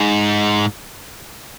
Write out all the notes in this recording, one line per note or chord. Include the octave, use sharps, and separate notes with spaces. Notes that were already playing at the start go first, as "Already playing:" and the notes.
Already playing: G#2